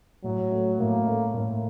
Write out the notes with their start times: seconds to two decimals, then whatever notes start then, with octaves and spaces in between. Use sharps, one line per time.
0.24 A2 F#3
0.51 A3
0.79 A2 A#3
1.07 A3
1.34 A2 A#3